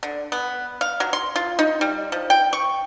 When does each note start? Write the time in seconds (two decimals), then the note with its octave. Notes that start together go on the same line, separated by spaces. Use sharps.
0.03 D3
0.32 B3
0.81 F5
1.00 F#3
1.13 C6
1.36 F4
1.59 D#4
1.81 G3
2.12 F3
2.30 G5
2.53 C#6